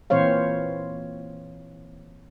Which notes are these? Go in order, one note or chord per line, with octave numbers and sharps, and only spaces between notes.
A#2 E3 C4 C5 C#5 F5